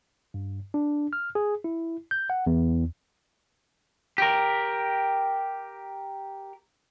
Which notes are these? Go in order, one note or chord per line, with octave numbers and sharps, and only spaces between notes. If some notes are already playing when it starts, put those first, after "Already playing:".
G2
D4
F6
G#4
E4
G6
F#5
E2
G4 A#4